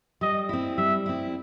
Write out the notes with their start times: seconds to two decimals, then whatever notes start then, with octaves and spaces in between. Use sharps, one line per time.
0.21 G3 D#5
0.49 C4 E4
0.77 G3 E5
1.06 C4 E4